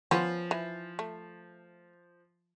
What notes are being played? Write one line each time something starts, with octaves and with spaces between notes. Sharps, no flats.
F3 B3 C#4 F4
E3
A3